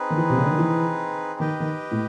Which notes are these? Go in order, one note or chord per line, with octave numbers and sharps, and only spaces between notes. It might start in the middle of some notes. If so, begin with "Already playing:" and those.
Already playing: C4 D#4 G#4 B4
D#3
E3
C3
C#3
D3
D#3
E3
D#3 G4 B4 D#5 G5
D#3
A2